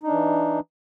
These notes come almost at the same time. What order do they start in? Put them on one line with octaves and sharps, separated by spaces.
D#4 D4 E3